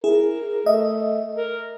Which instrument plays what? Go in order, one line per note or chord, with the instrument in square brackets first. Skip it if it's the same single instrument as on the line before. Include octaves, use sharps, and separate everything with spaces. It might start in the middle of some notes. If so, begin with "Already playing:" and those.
[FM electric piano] E4 G#4 [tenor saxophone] A#4
[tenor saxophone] A3 [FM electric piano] D#5 E5
[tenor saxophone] A#4